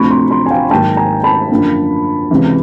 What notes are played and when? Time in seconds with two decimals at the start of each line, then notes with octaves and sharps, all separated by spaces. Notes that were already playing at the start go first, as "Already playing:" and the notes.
Already playing: D2 C3 F3 A3 C4 B5 C#6
0.10 A#5 C6
0.31 A#5 C6
0.46 G#5
0.51 F5 G5
0.70 G#2 D#3 F#3 A#3 G5 A5
0.97 G#5 A#5
1.24 A5 B5
1.51 F#2 D3 F3 A#3 D4
2.31 C#2 C3 E3